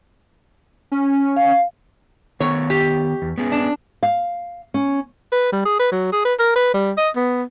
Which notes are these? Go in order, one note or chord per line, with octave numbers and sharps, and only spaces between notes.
C#4
F5
D#3 B3 C#5 A#5
G4
E2
B3 C#4 G#4
D4
F5
C#4
B4
G3
G#4
B4
F#3
G#4
B4
A#4
B4
G3
D#5
B3